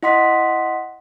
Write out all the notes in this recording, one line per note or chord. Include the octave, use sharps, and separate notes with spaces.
E4 D#5 F#5 C6 D#6 B6